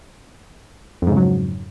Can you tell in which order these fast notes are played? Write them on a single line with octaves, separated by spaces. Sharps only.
F2 G#2 C#3 F#3